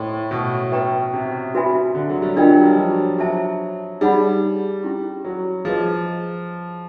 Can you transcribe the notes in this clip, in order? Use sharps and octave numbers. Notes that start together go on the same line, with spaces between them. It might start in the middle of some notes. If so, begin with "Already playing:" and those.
Already playing: A2 C5 D#5 G5 C6
B2
B4 E5 G5 A#5 C#6
C3
F#4 B4 E5 G#5 B5
D3
F#3
G3
G3 D4 F4 A#4 D#5 G5
F#3
F3
F#3
F#3 C5 E5 A5
G3 D#4 G#4 C#5 F#5 B5
C#4 E4 G4
F#3
F3 G#4 B4 D#5